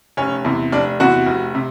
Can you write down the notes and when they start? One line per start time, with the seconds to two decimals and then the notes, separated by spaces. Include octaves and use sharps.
0.17 F1 C#4
0.45 E2 C3
0.72 F1 D4
1.00 E2 C3 F#4
1.27 F1
1.55 C3